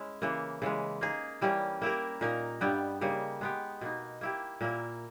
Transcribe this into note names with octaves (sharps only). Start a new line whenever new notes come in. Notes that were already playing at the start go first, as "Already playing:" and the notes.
Already playing: G#3 C#4 E4
C#3 E3 A#3
C#3 E3 G#3
A#3 D#4 G#4
E3 G3 A#3 C#4
A#3 E4 G4 A#4
A#2 A#3 D#4 A#4
G2 G3 B3 G4
C#3 G3 A#3 D#4
G#3 B3 G4
B2 A#3 D#4
A#3 E4 G4
A#2 A#3 E4 A#4